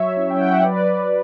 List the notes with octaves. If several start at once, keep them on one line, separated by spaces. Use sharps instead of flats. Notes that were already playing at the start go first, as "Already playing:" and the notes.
Already playing: F#3 C#5 E5
C#4 E4
G5
F#5
E5
F#3 B4 D5